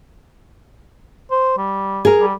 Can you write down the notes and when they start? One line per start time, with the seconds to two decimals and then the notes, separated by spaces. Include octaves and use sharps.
1.31 C5
1.58 G3
2.05 G#4 A#4
2.21 G3